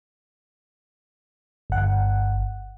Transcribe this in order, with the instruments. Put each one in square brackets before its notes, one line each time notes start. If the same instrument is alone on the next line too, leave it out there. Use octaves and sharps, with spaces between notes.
[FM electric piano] G1 F#5